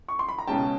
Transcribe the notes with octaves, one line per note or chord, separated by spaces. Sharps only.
C#6
C6
B5
A#5
C#2 B2 G#3 C#4 G5 A5